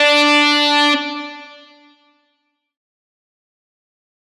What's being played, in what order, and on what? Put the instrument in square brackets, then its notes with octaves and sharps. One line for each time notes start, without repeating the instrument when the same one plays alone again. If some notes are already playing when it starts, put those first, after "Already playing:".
Already playing: [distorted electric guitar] D4